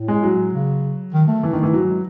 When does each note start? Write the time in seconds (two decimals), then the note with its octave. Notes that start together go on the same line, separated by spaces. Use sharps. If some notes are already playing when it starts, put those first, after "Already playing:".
Already playing: A2
0.08 G#3
0.23 F#3
0.53 C#3
1.14 D#3
1.28 A3
1.43 E3
1.53 D#3
1.63 E3
1.73 F#3
1.88 G#3